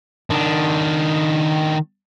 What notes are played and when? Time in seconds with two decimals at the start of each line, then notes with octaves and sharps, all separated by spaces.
0.30 D#3 D4